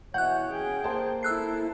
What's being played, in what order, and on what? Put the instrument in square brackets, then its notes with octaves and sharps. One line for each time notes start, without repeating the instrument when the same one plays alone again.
[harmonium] B2 E3 C#5 [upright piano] F#5 [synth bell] F#6 G6
[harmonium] C#4 [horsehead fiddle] G#4 G5
[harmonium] A#3 [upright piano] C5 A5
[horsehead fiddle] E4 A4 [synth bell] E6 F#6 C7